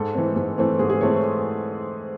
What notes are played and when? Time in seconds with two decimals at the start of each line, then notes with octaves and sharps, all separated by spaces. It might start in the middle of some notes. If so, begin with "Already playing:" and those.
Already playing: G#2 A4
0.14 E3 A3 C4
0.36 G#2
0.58 E3 A3 C4
0.79 G#2 G#4
0.90 G#4
1.01 E3 A3 C4 C#5